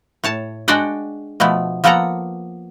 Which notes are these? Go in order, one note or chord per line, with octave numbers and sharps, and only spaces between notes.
A2 C#5 A5
G#3 D4 F#4 D5 F#5 G5
B2 F3 A3 B3
F3 A#3 B3 A4 F#5 A#5